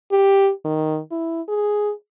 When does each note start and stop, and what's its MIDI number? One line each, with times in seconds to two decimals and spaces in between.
0.11 0.51 67
0.65 1.00 51
1.11 1.41 64
1.48 1.92 68